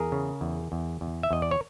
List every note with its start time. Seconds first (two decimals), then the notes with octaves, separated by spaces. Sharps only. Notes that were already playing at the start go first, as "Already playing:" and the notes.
Already playing: E2 G#4 A#4
0.12 C#3
0.41 E2
0.72 E2
1.01 E2
1.23 E5
1.31 E2 D#5
1.42 D5
1.51 C#5